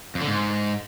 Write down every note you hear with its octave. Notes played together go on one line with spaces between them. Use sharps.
F2
D3
G#2